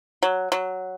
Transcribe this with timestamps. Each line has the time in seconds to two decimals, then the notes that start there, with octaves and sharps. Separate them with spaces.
0.23 F#3
0.52 F#3